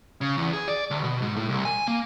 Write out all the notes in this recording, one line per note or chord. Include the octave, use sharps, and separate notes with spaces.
C#3
E2
G#4
D5
D2
B2
G#2
A2
C2
G#5
A#3